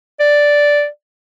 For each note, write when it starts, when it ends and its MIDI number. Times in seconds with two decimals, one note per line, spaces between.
0.20 0.87 74